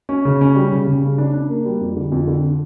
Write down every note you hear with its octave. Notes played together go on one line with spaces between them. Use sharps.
C#4
C#3
C#4
G3
C#3
C#3
C#3
D4
D4
A#3
G3
F2
D3
F2
D3